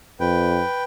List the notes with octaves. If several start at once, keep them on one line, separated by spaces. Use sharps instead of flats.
F2 B4 G5